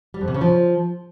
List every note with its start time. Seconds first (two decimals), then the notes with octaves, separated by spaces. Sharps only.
0.14 G3
0.21 F2
0.28 C3
0.34 C#3
0.41 F3